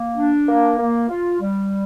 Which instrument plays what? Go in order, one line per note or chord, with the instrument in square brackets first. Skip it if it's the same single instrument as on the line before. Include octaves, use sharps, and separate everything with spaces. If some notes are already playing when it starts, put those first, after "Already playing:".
Already playing: [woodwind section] A#3
D4
A#3
A#3
F4
G3